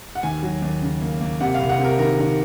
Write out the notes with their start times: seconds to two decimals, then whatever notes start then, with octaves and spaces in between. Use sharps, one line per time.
0.15 F#5
0.23 D#2 G#5
0.43 F#3
0.62 D#2
0.82 C#3
1.02 A#3
1.21 A#3
1.40 C3 F#5
1.55 F5
1.60 C2
1.70 F#5
1.79 C3
1.84 A#4
1.99 D#3 A#4
2.19 D#3